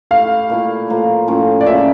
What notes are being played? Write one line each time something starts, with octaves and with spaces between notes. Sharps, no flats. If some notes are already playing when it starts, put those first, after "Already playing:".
A3 E4 G4 F5
A#2 A3 E4
A2 F3 A#3
A2 F3 C#4
D5
C#3 F3 A#3 C#4 E5